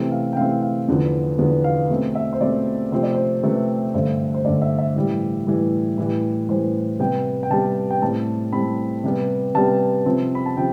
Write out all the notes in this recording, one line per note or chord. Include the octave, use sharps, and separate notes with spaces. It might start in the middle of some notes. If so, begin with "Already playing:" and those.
Already playing: C3 E3 A3 C4
F5
G5
C3 E3 A3 C4 F5
F5
E2 D3 F3 B3
E2 D3 F3 B3
F5
B2 A3 C4
E5
C5
B2 A3 C4 D5
C3 F3 A3 C4 C5
D5
C5
C3 F3 A3 C4 B4
G2 D3 A3 C5
C5
G2 D3 A3 D5
E5
E5
A2 E3 G3
A2 E3 G3
A2 E3 G3 B4
A2 E3 G3 C5
C3 G3 B3 G5
G5
C3 G3 B3 A5
G5
A2 G3 C4 A5
A2 G3 C4 B5
C3 G3 B3
C3 G3 B3 A5
C3 F3 C4
B5
A5
C3 F3 C4 G5